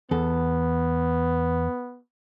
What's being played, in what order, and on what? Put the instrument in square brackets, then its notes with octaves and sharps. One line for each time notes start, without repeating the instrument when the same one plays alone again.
[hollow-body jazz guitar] E2 A4 [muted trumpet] B3